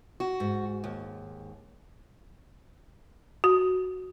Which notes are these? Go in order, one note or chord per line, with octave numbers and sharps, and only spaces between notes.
F#4
G#2
D#2
F#4